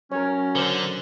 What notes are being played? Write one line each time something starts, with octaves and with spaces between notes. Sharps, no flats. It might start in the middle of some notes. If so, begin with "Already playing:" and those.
F#3 C#4 A#4 C#5
D3 A#4 C5 E6